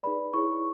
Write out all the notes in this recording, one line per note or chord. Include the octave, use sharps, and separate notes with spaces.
D#4 G#4 B4 D5 B5
E4 G#4 C#5 C#6